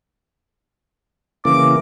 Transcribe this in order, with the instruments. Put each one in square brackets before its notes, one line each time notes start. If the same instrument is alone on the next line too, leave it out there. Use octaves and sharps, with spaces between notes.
[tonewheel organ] C#3 E3 A#3 [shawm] D6